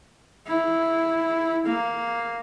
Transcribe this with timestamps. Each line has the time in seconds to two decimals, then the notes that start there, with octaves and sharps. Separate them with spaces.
0.47 E4
1.66 A#3